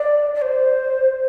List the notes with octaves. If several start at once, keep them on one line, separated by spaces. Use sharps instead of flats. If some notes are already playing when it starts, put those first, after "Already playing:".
Already playing: D5
D5
C5